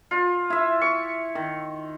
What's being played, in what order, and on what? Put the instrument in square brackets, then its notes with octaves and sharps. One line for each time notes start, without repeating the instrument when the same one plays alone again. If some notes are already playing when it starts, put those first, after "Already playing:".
[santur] F4
[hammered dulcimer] E4 E5
[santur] C#6
[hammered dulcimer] D#3